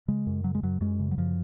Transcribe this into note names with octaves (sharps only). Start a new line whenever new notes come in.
C#3 G#3
F#2
C#3 F#3
G#3
F#2 F#3
F#2 G#3
C#3
F#3
F#2 F3